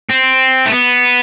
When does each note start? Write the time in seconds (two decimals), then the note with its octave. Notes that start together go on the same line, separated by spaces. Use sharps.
0.09 C4
0.66 A3
0.71 B3